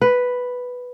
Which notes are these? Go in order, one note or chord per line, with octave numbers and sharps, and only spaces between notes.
B4